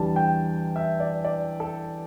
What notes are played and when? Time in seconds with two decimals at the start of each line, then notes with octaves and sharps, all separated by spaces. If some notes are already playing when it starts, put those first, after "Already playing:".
Already playing: E2 D3 G3 A5
0.16 G5
0.76 E5
1.00 D5
1.25 D5
1.60 A4